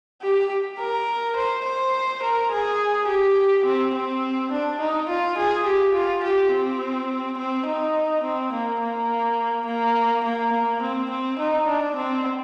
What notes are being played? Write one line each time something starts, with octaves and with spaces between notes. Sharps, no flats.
G4
A#4
C5
C5
A#4
G#4
G4
C4
C4
D4
D#4
F4
G#4
G4
F4
G4
C4
C4
D#4
C4
A#3
A#3
A#3
A#3
A#3
C4
C4
D#4
D4
C4